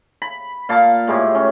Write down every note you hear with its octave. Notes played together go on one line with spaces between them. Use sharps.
B5
A#2 F5 A5
A2 G#3 E4 G4
C#4